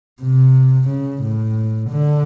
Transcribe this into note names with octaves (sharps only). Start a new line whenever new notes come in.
C3
C#3
A2
D3